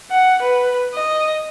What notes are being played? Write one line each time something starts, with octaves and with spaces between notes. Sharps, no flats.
F#5
B4
D#5